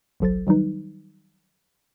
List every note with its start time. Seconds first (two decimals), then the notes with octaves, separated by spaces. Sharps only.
0.20 G1 C2 F#3 A4 C5 A6
0.47 D#3 F#3 G3 D#4 B4